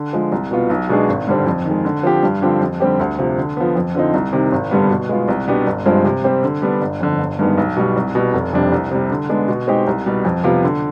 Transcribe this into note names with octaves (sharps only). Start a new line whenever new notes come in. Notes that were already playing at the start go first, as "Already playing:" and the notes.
Already playing: D3
F3 G#3
C2
B2 B3 F4
B1
B2 G#3 D4 G#4
G#1
G2 D3 G3 C4
F2
D#3
G#3
D3
F3 C4 G4
G2
D3 F3 C4 G4
F2
D3 G3 C4 G4
D2
C3 F3
D3
F3 B3
F2
D3 F3 C4 D#4
C2
C3 D#3
G#1
G2 D3 G3 B3
B2
G#3 B3 F4
C2
B2 B3 D4 G4
G1
G2 F3 G#3 C4
C3
G3 C4 G4 C5
D3
G3 B3 D4
G1
F2 D3
G1
G2 D#3 G#3 B3
B1
B2 G3
C2
B2 G3
F1
F2 C3 G3 D4
C2
C3 G3
D3
G#3 B3 D4
B2
G#3 C4 D#4 G4
C2
B2 G3
F2
C3 G3 B3 F4
D3